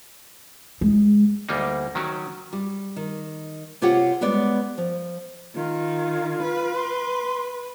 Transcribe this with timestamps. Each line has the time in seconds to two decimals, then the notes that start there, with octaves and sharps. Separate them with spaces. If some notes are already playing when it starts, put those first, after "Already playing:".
0.81 G#3
1.49 D2 G3 A#3 D#4
1.95 D#3 F#3 C#4
2.53 G3
2.96 D#3
3.82 C3 F4 G4 C#5 F#5
4.21 G3 G#3 B3 C#5 D5
4.78 F3
5.55 D#3 F4
6.42 B4
6.75 C6